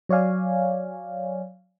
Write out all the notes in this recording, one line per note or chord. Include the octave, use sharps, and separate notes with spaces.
F#3 C#5 D5 F5 G#5